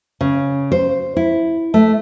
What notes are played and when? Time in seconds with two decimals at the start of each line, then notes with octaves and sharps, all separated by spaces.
0.21 C#3
0.72 C5
1.16 E4
1.74 A3